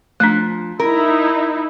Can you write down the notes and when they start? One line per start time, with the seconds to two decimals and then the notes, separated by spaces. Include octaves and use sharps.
0.20 F3 A3 D4
0.80 D#4 E4 A#4